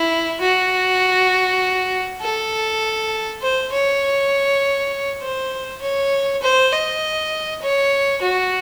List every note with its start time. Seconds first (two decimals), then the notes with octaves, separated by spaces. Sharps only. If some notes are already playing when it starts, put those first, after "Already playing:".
Already playing: E4
0.41 F#4
2.21 A4
3.42 C5
3.72 C#5
5.22 C5
5.82 C#5
6.42 C5
6.72 D#5
7.62 C#5
8.22 F#4